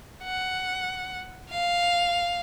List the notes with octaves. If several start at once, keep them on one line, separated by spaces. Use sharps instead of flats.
F#5
F5